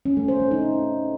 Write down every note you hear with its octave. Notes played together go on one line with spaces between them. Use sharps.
C#4
A3
C5
A3
D#4